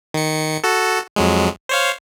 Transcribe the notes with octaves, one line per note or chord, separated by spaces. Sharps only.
D#3 C#7
F#4 A4
F2 F#3 G#3
C5 C#5 F5